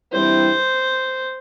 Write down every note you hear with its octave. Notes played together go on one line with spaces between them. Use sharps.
G2 E3 G3 C4 E4 C5